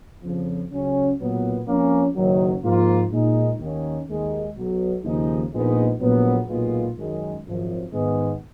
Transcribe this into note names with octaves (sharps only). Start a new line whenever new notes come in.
F2 C#3 F3
C#2 C#3 F#3 C#4
B1 A#2 F#3 B3
F2 F3 A#3 C#4
F#1 F#2 D#3 F#3
G#2 F3 A#3 F4
A#2 G#3 D#4
D#2 D#3 A#3 C#4
D#2 D#3 G#3
B1 B2 F#3
D#2 C#3 F3 G#3 D#4
A#1 A#2 G#3 B3 D#4
A#1 A#2 F#3 B3
B1 A#2 G#3 B3 F4
F#2 D#3 G#3
G#1 F#2 F3
G#2 D#3 G#3 B3